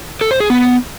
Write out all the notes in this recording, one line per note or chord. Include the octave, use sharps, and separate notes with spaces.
A4
C5
G#4
B3